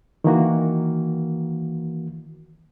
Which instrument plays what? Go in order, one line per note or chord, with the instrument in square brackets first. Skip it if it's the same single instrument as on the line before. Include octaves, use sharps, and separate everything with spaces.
[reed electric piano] D#3 E3 A#3 F#4